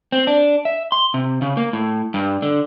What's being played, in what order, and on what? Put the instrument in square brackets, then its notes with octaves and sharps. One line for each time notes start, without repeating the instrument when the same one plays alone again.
[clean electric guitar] C4
D4
E5
C6
C3
C#3
A#3
A2
G2
D3